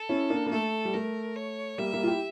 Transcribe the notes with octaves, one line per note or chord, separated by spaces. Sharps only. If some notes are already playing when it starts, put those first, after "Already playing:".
Already playing: A4
C#4 E4
A#3 D4
A#3
A3 A4
G3
A3 A#4
C#5
G3 A#3 E5
G3 A#3
F4
E4 G4